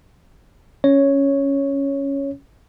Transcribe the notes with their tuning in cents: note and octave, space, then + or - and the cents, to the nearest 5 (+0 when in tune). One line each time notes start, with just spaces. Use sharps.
C#4 +0 C#5 +0